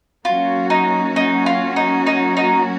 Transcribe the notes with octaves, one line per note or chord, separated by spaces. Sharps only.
F#3 A#3 C#4 F4 F#4
D#4
D#4
F4
D#4
D#4
D#4